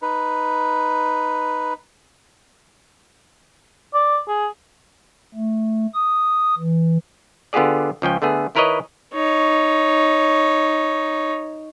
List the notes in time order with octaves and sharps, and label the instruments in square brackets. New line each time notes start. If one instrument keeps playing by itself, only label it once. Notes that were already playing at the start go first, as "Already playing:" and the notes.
[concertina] D#4 B4
[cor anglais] D5
G#4
[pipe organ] A3
D#6
E3
[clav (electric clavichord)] D3 B3 F4 G4 G#4 D5
C#2 F3 C#4 G5
D3 A3 B3 G#4
D#3 E4 A#4 B4 C#5 D#5
[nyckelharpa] D#4 C#5